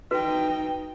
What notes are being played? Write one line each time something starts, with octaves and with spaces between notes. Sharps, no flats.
D#4 F#4 B4 G5